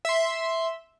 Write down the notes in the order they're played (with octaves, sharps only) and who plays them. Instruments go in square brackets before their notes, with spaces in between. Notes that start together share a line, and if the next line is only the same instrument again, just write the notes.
[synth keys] E5 C6